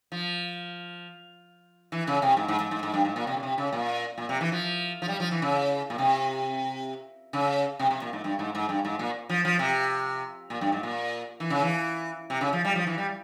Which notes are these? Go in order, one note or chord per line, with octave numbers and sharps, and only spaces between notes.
F3
E3
C#3
C3
G#2
G#2
G#2
G#2
G#2
G2
G#2
A#2
C3
C#3
C3
C#3
A#2
A#2
C3
E3
F3
F3
G3
F3
E3
C#3
A#2
C3
C#3
C3
C3
A#2
G#2
G2
G#2
G#2
G2
G#2
A#2
F3
F3
C3
A#2
G2
G#2
A#2
E3
C#3
E3
C3
C#3
F3
G3
F3
E3
G3